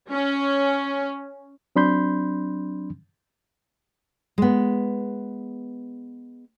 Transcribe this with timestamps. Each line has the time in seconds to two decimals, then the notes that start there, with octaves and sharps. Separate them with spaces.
0.10 C#4
1.76 F#3 C4 D4 B5 C6 G6
4.38 G#3 B3